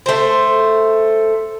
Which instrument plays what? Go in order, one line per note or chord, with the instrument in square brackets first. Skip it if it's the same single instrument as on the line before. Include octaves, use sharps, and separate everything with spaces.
[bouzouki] A3 C5